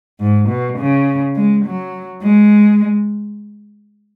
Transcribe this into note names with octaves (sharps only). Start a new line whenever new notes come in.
G#2
B2
C#3
G#3
F#3
G#3